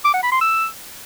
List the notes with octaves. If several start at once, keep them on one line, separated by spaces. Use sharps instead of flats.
D6
F#5
B5
C6
E6